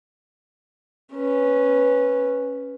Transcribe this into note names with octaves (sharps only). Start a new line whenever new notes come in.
C#4 B4